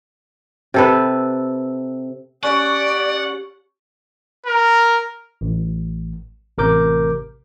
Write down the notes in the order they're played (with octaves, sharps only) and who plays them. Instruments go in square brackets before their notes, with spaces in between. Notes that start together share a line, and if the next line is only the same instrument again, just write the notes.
[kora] C3 A4 B4
[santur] C#4 C#5 [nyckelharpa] G4 [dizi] D5 [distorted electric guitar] F#5
[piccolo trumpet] A#4
[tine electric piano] A1
A1 C3 A#4 D6 G6